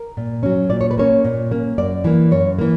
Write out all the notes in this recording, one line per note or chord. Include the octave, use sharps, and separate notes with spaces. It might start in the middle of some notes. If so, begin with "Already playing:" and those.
Already playing: A#4
A#2
F#3 C#4
A#2 D5
C#5
B4
A#3 C#4 C#5
A#2
A#3 C#4
F#2 D5
E3 A#3
F#2 C#5
E3 A#3